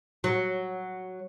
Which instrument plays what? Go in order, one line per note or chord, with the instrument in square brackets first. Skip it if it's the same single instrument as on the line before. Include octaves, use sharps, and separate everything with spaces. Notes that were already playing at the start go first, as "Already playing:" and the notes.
[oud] F#3